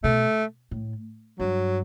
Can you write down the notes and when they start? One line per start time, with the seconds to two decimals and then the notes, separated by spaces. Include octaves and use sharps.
0.04 B2 A3
0.71 A2
1.39 G2 F#3